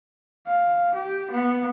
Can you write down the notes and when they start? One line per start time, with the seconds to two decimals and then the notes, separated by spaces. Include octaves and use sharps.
0.47 F5
0.94 G4
1.31 B3